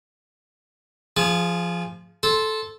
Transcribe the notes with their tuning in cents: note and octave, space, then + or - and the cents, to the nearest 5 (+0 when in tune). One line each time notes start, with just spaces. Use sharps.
F3 -10 G#4 +5 A5 -45
A4 -10 C5 +0